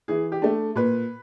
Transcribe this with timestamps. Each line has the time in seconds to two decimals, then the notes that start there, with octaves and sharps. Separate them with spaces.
0.08 E3 G#4
0.32 G4
0.42 A3 D4
0.76 A#2 B4